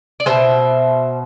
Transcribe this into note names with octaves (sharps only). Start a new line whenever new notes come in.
D5
B2 G#3 C5 E5